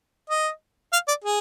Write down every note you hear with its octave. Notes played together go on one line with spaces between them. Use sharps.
D#5
F5
D5
G#4